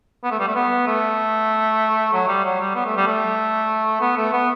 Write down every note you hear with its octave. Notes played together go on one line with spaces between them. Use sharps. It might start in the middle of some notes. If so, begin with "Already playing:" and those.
B3
A3
G3
A3
B3
A3
F#3
G3
F#3
G3
B3
A3
G3
A3
B3
A3
B3